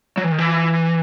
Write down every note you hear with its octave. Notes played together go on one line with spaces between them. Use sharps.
F#3
E3
D#3
E3